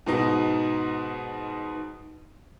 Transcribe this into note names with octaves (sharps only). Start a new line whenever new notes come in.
G#2 B2 D#4